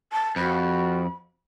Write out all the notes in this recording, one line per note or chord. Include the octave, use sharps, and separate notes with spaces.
A5
F2 F#4 B5